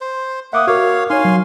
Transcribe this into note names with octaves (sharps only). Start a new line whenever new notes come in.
C5
A#3 E5 F#5 D6 D#6
F#4 A#4 C#5 F5
D#4 C#5 F5 G#5 C6
F#3